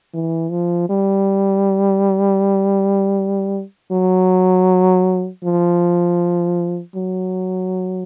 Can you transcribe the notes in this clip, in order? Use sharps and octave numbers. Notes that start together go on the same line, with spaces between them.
E3
F3
G3
F#3
F3
F#3